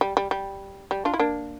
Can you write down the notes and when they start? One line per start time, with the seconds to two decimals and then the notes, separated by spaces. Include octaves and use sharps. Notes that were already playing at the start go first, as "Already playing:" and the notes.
0.01 G3
0.17 G3
0.31 G3
0.91 G3
1.05 D4 F4
1.14 E4
1.19 A#3 D4